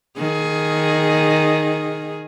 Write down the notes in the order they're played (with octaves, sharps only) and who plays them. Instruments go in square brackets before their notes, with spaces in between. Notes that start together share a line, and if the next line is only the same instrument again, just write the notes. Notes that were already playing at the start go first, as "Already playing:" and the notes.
[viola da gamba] D#3 G#4